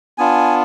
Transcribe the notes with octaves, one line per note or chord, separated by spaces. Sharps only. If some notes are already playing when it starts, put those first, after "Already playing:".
B3 D4 F4 G#5